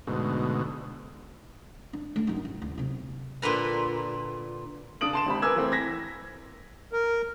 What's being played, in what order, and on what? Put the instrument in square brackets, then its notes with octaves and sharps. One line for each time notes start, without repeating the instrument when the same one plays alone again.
[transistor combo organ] D2 G#2 B2
[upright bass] D4
A3 D4
F#2 D#4
A1
D2
B1 C3
[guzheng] A#2 D3 B4 A#5
[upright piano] C#3 D4 D#6 D7 F#7
A5 C6 E7
G#1 C3 B5
A#4 B4 G#5 D6 E6 G#6
E3 A3 C4
G#6 A#6 B6
[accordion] A#4